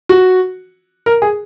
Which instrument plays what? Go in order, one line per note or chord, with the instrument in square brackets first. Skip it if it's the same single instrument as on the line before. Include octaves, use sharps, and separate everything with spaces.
[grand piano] F#4
A#4
G#4